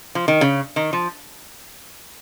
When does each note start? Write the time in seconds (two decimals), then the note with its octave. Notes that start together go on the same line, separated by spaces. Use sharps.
0.15 F3
0.28 D#3
0.41 C#3
0.76 D#3
0.93 F3